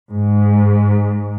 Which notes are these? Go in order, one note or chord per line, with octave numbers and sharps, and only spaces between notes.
G#2